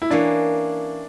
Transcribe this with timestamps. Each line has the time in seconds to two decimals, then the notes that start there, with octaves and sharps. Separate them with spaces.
0.02 E4
0.11 E3 A#3 C#4 D4